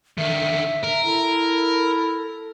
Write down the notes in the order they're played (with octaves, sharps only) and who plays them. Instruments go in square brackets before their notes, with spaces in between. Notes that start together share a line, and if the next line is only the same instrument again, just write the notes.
[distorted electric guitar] D3 D#3 [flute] E5
[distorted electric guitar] A#4
[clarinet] E4 [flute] A4